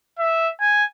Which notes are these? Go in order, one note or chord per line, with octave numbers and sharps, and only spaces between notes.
E5
G#5